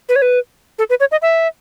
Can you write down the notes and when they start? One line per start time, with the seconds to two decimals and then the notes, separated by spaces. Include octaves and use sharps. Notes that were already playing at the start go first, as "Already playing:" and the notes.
0.09 B4
0.16 C#5
0.22 B4
0.79 A4
0.90 B4
1.00 C#5
1.11 D#5
1.22 E5